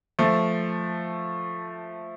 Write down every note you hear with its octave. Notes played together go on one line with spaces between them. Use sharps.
F3 A3